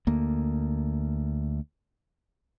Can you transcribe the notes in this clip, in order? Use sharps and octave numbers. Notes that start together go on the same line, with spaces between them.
D2 A#3